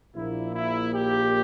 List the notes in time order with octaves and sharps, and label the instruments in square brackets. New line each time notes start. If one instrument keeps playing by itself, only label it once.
[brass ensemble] A#1 A#2 A#3 E4
E4
G4